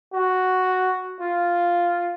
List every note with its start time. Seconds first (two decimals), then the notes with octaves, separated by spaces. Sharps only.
0.13 F#4
1.20 F4